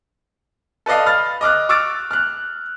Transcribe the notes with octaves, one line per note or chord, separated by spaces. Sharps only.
A4 B4 D5 D#5 F5
B5 F6 A6
D#5 D6 F6 F#6
C#6 D6 E6 F6 A6 D7
F6 F#6